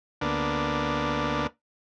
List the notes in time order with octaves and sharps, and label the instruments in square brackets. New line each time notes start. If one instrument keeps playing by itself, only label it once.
[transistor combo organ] D2 A#3 B3 D4